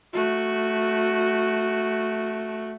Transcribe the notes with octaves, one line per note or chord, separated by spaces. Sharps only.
A3 F#4